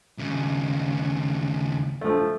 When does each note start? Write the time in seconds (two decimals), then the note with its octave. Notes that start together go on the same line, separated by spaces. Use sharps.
0.18 D#2 C#3
2.01 F3 A3